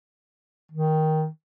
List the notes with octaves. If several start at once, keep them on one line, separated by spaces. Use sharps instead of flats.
D#3